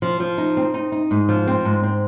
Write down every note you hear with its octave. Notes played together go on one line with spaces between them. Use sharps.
F3
F3
D#4
C4
D#4
D#4
G#2
F3
C4
G#2
C4